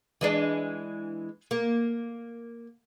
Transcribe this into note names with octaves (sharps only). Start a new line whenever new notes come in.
E3 G#3 D4
A#3